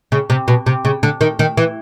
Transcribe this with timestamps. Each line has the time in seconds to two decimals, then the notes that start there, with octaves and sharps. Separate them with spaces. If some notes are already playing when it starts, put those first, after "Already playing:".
0.12 C#3
0.30 C3
0.48 B2
0.66 C3
0.85 C#3
1.03 D3
1.21 D#3
1.39 D#3
1.57 E3